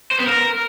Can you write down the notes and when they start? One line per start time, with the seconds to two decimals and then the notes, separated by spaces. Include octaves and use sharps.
0.11 C5
0.19 B3
0.26 A#4